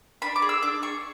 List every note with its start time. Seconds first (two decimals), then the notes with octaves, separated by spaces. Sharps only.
0.22 D4 B5
0.36 D6
0.42 G#4
0.49 E6
0.63 D4 D6
0.82 G#4 C#6